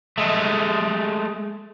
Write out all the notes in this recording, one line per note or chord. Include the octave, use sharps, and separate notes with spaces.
G#3 A3